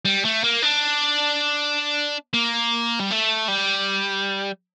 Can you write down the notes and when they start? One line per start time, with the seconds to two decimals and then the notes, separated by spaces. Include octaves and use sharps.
0.05 G3
0.25 A3
0.44 A#3
0.62 D4
2.34 A#3
2.99 G3
3.11 A3
3.48 G3